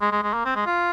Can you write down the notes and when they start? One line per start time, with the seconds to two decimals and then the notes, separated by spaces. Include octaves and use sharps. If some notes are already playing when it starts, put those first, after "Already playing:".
0.01 G#3
0.12 G#3
0.23 G#3
0.34 A#3
0.45 C4
0.56 G#3
0.66 F4